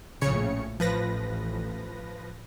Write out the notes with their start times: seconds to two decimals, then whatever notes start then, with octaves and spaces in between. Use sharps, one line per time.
0.21 A#1 A2 C#3 C#5 C#7
0.80 A1 F3 B4 A#6